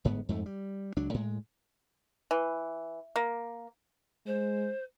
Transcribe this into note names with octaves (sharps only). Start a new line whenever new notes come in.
G1 G#2 B3
F2 G#2 A3
G3
C#2 F#3 D4
A2 G#3
E3
A#3
G#3 C5